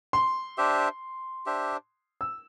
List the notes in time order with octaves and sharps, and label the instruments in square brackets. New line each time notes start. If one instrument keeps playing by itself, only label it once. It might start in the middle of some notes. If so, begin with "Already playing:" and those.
[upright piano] C6
[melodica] D4 G4 C5 E5
D4 G4 C5 E5
[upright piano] E6